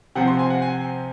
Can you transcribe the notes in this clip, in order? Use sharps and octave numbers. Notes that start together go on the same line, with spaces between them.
C3 F3 C4 F#5
C6
G#5
F#5
G#5